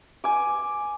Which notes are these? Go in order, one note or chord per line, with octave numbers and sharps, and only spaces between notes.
G#5 D6